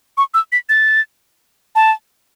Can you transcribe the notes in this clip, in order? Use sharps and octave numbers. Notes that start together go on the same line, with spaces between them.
C#6
E6
B6
A6
A5